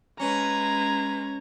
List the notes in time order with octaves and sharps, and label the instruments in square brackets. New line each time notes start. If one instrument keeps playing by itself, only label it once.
[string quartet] G#3 B4 [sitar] C#4 [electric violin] A#5 G#6